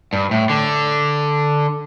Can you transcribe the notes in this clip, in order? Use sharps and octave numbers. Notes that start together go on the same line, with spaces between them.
G2
A2
D3